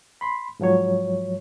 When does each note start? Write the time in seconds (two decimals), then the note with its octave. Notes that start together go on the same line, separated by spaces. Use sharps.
0.21 B5 C6
0.60 G#2 F3 F#3 C#5